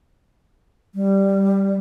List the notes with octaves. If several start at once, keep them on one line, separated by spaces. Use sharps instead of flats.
G3